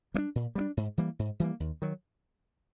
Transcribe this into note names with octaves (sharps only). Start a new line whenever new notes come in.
G3 A#3 D4
A#2
G3 A#3 D4
G#2
E3 G3 A#3
G#2
E3 G3 A#3
D#2
D#3 F#3